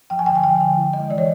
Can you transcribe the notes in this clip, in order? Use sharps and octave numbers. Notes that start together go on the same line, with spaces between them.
F3 G5
G#5
D3 G5
G#5
F3 G5
D3 G5
E4
G#3 D#5
E3 D5
C#5